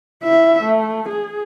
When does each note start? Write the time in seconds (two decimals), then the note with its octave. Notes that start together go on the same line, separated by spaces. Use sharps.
0.23 E4 E5
0.63 A3
1.08 G#4